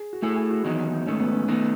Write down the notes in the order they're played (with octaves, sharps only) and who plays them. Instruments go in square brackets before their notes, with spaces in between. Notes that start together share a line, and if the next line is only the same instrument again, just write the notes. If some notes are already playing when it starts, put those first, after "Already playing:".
Already playing: [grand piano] G#4
F#4
[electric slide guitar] A3 E4 A4 [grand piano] G#4
[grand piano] G#4
F#4
[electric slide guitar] E2 D#3 F#3 [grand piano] D#4
[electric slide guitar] G#2 D#3 A3 [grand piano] C#4
[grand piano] B3
C#4
[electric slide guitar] D#3 A3 D#4 [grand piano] B3